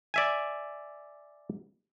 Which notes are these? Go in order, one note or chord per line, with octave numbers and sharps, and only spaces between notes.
D5 E5 G#5